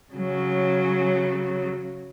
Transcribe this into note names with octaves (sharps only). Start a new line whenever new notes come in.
C#3 F#3